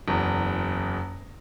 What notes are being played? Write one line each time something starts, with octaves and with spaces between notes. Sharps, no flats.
F#1 E2